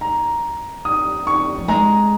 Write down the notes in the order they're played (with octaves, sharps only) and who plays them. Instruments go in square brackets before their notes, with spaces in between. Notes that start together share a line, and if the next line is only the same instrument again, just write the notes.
[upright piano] A#5
D#6
C#6
[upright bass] F3
[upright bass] G#3 [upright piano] A#5